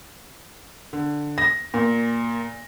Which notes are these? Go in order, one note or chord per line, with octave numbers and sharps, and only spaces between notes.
D3
A#6
A#2